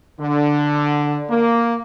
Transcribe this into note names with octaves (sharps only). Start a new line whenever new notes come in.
D3
A#3